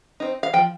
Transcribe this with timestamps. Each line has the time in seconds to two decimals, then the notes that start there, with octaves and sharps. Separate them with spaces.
0.20 C4 D#4
0.43 F5
0.53 F3 G5